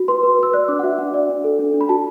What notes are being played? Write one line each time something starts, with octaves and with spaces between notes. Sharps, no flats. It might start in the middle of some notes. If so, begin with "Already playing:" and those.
Already playing: F#4
B4 C6
B4
B4 E6
D5 F#6
D4 D6
F#5
F#4 E5
D4 F#5
D5
D4
A4
D4
D4
B5
F#4 A5